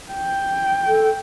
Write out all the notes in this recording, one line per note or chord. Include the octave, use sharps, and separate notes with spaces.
G5
A4